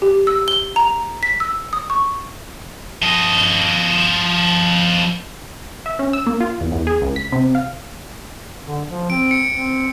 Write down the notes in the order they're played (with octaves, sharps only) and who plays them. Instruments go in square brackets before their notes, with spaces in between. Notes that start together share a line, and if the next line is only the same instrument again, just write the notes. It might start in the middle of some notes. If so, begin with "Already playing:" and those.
[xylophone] G4
E6
G7
A#5
B6
E6
D#6
C#6
[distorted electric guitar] F3 D#5
[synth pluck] E5
C#4
E6
A#3
F4
E2
E2
G#4
C#2
B6
C3
F5
[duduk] D3
F3
[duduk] C4 [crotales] D7
[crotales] C#7
[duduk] C4